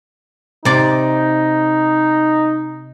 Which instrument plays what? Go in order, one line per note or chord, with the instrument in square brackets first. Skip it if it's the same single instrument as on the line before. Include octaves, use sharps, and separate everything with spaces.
[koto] C3 D5 [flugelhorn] D#4